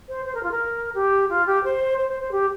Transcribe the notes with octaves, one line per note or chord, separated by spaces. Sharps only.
C5
C5
A#4
F4
A#4
G4
F4
G4
C5
C5
C5
C5
G4